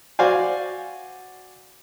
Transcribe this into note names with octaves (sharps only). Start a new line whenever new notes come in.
F#4 C5 D5 F5 G#5